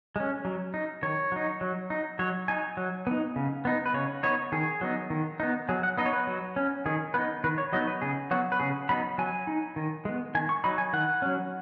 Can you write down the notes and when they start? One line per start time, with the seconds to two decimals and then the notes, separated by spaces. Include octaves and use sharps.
0.16 G#3 C#4
0.45 F#3
0.74 D#4
1.03 D#3 C#5
1.32 F#3 D#4
1.61 F#3
1.90 D#4
2.19 F#3 C#5
2.48 D#4 G#5
2.77 F#3
3.07 B3 D#4
3.36 C#3
3.65 B3 D#4
3.86 B4
3.94 C#3 C#5
4.23 B3 D#4 C#5
4.52 D#3 G#4
4.81 F#3 B3 D#4
5.10 D#3
5.40 B3 D#4
5.69 F#3 G#4
5.83 F#5
5.98 B3 D#4 D#5
6.06 C#5
6.13 B4
6.27 F#3
6.56 C#4
6.86 D#3 G#4
7.14 B3 D#4 B4
7.44 D#3 B4
7.58 C#5
7.73 F#3 B3 D#4 D#5
7.87 B4
8.02 C#3 G#4
8.31 F#3 B3 F#4
8.52 B4
8.59 C#3 G#4
8.89 F#3 B3 D#4 B5
9.18 F#3 G#5
9.47 D#4
9.76 D#3
10.05 G#3 B3
10.35 D#3 G#5
10.49 C#6
10.64 F#3 D#4 B5
10.78 G#5
10.93 D#3 F#5
11.22 F#3 C#4